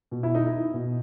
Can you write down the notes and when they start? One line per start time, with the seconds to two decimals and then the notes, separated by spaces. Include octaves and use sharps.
0.11 B2
0.23 E4
0.35 D#4
0.46 E4
0.74 B2